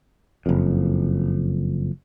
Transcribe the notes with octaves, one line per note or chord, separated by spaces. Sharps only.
F#1 F2